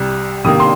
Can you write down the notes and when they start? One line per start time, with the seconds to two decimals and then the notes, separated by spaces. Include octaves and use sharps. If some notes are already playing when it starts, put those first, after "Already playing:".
Already playing: C2 C3 G3
0.45 C3 D#3 A#3 D#6
0.60 C6